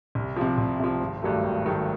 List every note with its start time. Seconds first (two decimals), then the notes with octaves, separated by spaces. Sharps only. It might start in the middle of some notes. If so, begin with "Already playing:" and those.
0.15 C2
0.36 C3 F3
0.58 C2
0.80 C3 F3
1.00 G#1
1.22 G2 D#3 F#3 A3
1.43 G#1
1.65 G2 D#3 F#3 A3